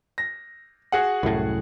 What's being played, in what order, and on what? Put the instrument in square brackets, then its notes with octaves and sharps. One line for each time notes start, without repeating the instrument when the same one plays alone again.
[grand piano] A#6
F#4 G#4 F#5
[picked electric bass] C2 F#2 A2